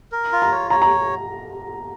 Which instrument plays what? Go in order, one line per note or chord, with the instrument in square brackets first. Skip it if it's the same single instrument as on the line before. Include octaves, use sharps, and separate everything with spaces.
[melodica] A#4
F4
[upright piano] A#5
[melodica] C#5
[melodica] C#5 [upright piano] A#5
[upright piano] A#5